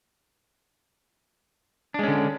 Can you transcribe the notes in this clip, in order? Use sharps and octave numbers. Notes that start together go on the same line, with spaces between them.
D3 G#3 C#4 D4